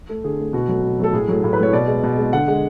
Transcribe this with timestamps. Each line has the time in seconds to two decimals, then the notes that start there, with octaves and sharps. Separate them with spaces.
0.09 A3
0.24 D3 G#4
0.39 A3
0.53 B2 F#4
0.68 F#3 A3
0.83 B2
0.99 F#3 A3 A4
1.13 A2 G#4
1.28 F#3 A3
1.44 A2
1.53 B4
1.59 F#3 A3 C#5
1.73 B2 D5
1.87 G#3
2.03 B2
2.18 G#3
2.33 D3 F#5
2.48 G#3